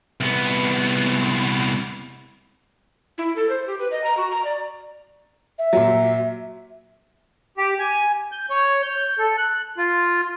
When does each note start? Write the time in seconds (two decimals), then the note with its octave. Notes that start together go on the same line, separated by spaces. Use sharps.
0.20 C2 B3
3.18 E4
3.36 A4
3.49 C5
3.67 G4
3.80 B4
3.91 D#5
4.04 A#5
4.17 F#4
4.31 A#5
4.45 D5
5.59 E5
5.73 A#2 F#3
7.58 G4
7.79 G#5
8.32 G6
8.50 C#5
8.83 G6
9.19 A4
9.38 F#6
9.78 F4